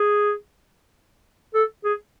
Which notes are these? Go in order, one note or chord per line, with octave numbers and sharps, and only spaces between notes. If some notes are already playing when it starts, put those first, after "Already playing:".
Already playing: G#4
A4
G#4